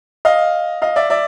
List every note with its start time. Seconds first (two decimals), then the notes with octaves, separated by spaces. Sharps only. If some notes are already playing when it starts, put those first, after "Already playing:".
0.25 D#5 F5
0.82 D#5 F5
0.96 D5 E5
1.10 D5 E5